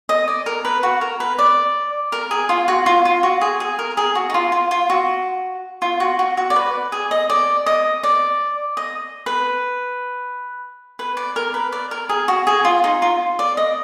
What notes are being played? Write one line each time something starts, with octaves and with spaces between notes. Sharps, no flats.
D#5
D5
A#4
B4
F#4
A#4
B4
D5
A#4
G#4
F4
F#4
F4
F4
F#4
G#4
G#4
A#4
G#4
F#4
D#4
F4
F4
F4
F#4
F4
F#4
F#4
F#4
D5
B4
G#4
D#5
D5
D#5
D5
D#5
B4
B4
D5
A#4
B4
D5
A#4
G#4
F#4
G#4
F4
D#4
F4
D5
D#5